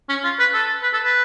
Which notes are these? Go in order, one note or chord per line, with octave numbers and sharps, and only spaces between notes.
C#4
F4
B4
A4
B4
A4
B4